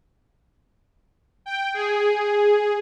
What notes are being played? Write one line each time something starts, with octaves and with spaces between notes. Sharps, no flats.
G5
G#4